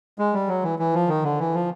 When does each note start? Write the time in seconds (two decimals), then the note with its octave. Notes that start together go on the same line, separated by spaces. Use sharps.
0.19 G#3
0.33 G3
0.48 F#3
0.63 E3
0.79 E3
0.94 F3
1.08 D#3
1.24 D3
1.39 E3
1.54 F3